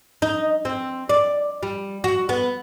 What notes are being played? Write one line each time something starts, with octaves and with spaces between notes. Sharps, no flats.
D#4
C4
D5
G3
F#4
B3